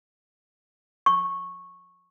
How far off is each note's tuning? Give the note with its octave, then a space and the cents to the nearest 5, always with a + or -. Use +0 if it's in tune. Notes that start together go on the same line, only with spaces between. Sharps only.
C#6 -10